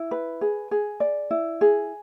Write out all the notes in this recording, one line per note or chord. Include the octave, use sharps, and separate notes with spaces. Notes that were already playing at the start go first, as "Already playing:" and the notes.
Already playing: E4
B4
G#4
G#4
D5
E4
G#4